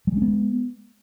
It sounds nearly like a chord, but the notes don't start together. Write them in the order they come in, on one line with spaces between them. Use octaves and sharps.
G3 G#3 C#4 B3